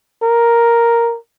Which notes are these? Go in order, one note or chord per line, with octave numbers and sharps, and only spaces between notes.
A#4